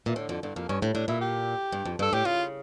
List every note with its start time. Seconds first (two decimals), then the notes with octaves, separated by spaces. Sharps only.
0.06 A#2 E3
0.16 A2 D3
0.29 F2 D3
0.42 G2 D3
0.56 F2 A#3
0.69 G2 C#4
0.82 A2
0.95 A2 D4
1.08 A#2 E4
1.21 G4
1.72 G2
1.86 F2
1.99 G2 A4
2.13 A2 G4
2.25 C#3 F4